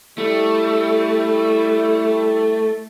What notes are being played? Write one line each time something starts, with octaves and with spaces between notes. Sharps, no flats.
G3 A3 E4